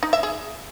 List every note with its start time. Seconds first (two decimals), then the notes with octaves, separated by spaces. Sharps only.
0.03 D#4
0.13 E5
0.23 G#4